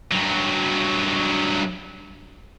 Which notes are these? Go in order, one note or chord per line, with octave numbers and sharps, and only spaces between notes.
G2 F#3